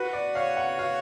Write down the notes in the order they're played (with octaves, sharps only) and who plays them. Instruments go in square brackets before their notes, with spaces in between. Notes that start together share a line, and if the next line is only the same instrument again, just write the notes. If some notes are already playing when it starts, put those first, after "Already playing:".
Already playing: [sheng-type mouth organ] F#4 [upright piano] B4
[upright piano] D5
[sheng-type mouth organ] C#5 [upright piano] F5
[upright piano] F#5
[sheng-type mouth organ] F#4 [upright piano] F5